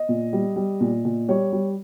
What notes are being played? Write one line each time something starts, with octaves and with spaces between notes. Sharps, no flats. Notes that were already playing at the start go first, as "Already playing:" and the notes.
Already playing: D#5
A#2
G3
G3
A#2
A#2
G3 C#5
G3